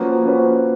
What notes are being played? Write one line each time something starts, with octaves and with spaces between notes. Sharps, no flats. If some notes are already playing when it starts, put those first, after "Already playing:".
Already playing: F3 A#3 C#4 F#4 B4
F3 A#3 C#4 F#4 B4